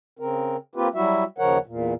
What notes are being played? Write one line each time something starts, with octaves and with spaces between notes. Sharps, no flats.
C#3 C4 A#4
A#3 C4 F4 G4 B4
F#3 G3 E4 F#4 E5
D#2 C#3 F3 A#4 C#5 F#5
E2 A#2